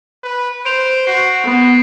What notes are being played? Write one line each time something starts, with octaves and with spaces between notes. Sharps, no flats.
B4
C5 D7 F7
F#4 C7
B3